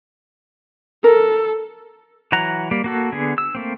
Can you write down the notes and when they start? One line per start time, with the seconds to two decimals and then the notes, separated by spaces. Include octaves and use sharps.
1.04 A4 A#4
2.32 E3 F#3 F#5 A#5
2.71 G3 A#3
2.84 A#3 F#4 A4
3.12 D3 B3 G#4
3.38 E6
3.55 A3 A#3 C4